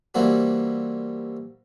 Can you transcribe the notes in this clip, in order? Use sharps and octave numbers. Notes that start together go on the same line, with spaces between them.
E3 G3 A#3 C4 D4 F#4